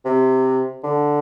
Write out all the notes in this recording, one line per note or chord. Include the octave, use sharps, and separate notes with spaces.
C3
D3